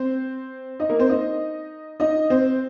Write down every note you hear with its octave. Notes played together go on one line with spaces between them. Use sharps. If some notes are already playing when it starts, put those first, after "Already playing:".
Already playing: C4 C5
D#4 D#5
A#3 A#4
C4 C5
D#4 D#5
D#4 D#5
C4 C5